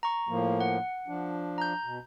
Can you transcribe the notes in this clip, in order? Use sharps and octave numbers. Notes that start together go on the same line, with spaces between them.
A#5 C#6
A2 F3 A#3
F#5
F3 D4
A#5 G6
B2